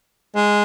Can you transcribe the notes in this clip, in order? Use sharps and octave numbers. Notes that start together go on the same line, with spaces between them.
G#3